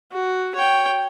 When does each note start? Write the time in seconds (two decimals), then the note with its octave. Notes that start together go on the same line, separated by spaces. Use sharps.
0.12 F#4
0.55 C#5 G5